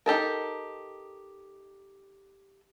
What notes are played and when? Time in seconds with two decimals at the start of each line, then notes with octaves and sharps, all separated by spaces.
0.06 D#4 G4 A4 A#4